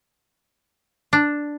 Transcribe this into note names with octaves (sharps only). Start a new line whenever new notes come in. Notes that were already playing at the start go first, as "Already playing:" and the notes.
D4